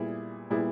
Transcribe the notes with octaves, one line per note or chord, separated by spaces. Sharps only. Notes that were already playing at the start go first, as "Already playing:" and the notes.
Already playing: A#2 G3 B3 E4 G#4
A#2 G3 B3 E4 G#4